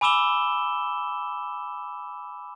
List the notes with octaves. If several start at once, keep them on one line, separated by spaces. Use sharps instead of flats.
G#5 B5 D6 E6 E7 G7